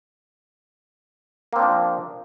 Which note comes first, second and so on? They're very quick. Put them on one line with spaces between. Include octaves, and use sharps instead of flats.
A#3 C4 D4 F3